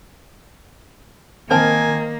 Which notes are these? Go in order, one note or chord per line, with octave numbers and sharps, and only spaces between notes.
D#3 A#3 C4 A#4 G#5 A5